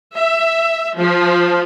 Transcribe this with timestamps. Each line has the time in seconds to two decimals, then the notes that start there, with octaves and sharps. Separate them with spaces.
0.15 E5
0.98 F3